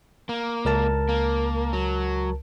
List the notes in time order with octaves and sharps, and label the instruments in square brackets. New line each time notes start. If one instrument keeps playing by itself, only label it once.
[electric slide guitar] A#3
[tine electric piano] C#2 A#4 A5
[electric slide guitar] A#3
F#3